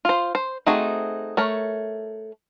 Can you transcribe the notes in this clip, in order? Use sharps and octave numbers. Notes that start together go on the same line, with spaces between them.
F4 C5
C5
A3 C4 D#4 F#4 G#4
A3 A#4 C#5